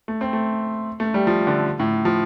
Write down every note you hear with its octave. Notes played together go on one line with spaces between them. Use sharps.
A3
C4
A3
A3
G3
F3
D3
A2
F3